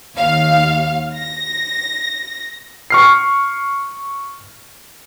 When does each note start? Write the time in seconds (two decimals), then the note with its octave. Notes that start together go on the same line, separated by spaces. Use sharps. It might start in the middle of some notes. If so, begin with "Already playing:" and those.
0.16 D#2 F5
1.14 A#6
2.90 C#6 F6 C7